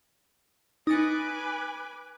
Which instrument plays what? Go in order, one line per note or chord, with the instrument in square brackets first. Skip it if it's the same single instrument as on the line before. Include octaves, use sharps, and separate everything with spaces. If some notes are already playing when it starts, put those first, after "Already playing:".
[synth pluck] D#4 A6 C#7 [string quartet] B4 G#5 D6